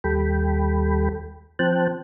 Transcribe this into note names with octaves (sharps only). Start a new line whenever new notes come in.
D#2 G3 A4 G5 B5
F3 C4 C5 G5 A5 F#6